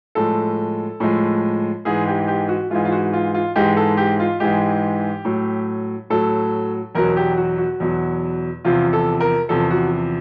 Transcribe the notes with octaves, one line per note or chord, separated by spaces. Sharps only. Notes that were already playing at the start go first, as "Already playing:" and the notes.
A2 F3 G#3 A4
A2 F3 G#3
G#2 E3 G#3 G#4
G4
G4
F#4
G#2 E3 G#3 F4
F4
F#4
F4
F4
G#2 E3 G#3 G4
A4
G4
F4
G#2 E3 G#3 G4
A2 F#3
A2 F#3 A4
E2 B2 F#3 A#4
G4
F#4
F#4
E2 B2 F#3
E2 C3 F3 F4
A4
A#4
E2 C3 F3 A4
F#4